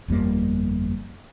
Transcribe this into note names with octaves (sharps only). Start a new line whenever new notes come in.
G1 F2 G3 A#3